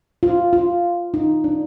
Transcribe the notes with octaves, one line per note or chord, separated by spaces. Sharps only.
F4
F4
D#4
D4